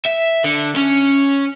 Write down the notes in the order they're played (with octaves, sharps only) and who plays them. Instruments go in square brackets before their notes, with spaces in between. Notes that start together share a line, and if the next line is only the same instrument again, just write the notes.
[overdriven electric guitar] E5
D3
C#4